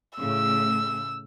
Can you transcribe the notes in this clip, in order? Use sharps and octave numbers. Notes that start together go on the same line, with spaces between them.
A2 C#3 E6